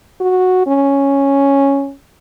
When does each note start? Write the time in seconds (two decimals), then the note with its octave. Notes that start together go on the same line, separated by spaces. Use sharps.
0.21 F#4
0.67 C#4